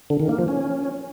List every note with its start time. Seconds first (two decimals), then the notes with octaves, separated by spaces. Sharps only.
0.10 D3
0.20 D#3
0.29 A#3
0.39 F3
0.48 C#4